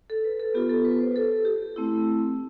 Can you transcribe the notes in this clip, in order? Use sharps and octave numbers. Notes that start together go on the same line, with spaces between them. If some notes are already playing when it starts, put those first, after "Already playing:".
A4
B4
A4
B3 F4 G4
A4
B4
C5
A4
G4
A3 C4 E4